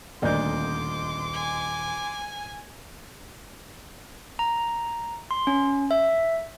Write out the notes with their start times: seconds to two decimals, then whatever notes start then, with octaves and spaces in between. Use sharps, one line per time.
0.22 D#1 D2 A#3 D5 D#5 C6 D6 G6
1.33 G#5
4.39 A#5
5.31 C6
5.47 C#4
5.91 E5